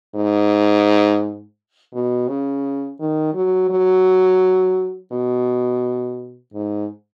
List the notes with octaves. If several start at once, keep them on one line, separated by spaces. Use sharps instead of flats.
G#2
B2
C#3
D#3
F#3
F#3
B2
G#2